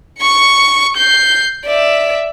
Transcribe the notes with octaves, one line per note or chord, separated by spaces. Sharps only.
C#6 C#7
G6 C7
D5 E5